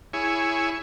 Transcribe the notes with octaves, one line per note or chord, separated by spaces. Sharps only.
E4 G#4 C#5